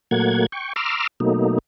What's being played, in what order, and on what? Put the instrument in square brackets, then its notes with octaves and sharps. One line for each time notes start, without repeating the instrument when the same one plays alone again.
[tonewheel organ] A#2 F#3 A3 A#3 F#5 G#6
G5 C#6
A#5 C6 D6 E6 F6
B2 F#3 A3 A#3 D#4